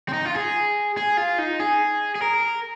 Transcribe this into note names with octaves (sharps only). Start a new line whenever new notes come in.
C4
D#4
F4
G#4
G#4
F4
D#4
G#4
G#4
A#4